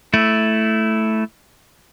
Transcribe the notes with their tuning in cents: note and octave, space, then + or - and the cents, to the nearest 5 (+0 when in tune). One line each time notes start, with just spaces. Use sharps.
A3 -5 E4 +0